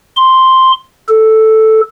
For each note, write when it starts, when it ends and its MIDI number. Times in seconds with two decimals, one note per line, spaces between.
0.16 0.72 84
1.08 1.81 69